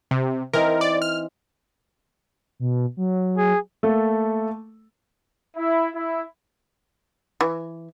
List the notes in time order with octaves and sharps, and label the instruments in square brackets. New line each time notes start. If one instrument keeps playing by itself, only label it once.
[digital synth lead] C3
[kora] E3 C4 D#4 [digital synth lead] A#4
[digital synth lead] D5
F6
[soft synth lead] B2
F#3
[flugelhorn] G#4
[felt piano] A3 A#3 A4
[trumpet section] E4
E4
[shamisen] E3